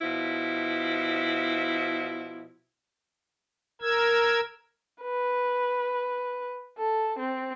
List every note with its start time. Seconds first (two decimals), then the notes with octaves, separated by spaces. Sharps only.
0.01 B2 F3 E4
3.82 A#4 E6 G#6
5.02 B4
6.77 A4
7.18 C4